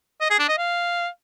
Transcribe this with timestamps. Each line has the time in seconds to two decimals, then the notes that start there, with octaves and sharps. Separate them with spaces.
0.21 D#5
0.30 G#4
0.39 D4
0.49 D#5
0.58 F5